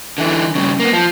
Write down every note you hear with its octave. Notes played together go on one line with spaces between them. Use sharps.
D3 E3
G2 C#3
A#3 B3
F3